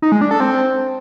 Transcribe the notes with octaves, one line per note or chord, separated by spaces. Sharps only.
D#4
G#3
D4
A4
C4